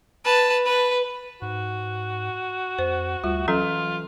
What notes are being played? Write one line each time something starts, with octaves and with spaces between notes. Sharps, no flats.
B4 A5
B4
G#2 F#4
F2 C5
D2 G3 F4
E3 F#3 C#4 F4 A4